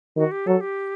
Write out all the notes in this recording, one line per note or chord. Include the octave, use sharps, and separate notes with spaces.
D#3 F#4
G4
F#3 A4
G4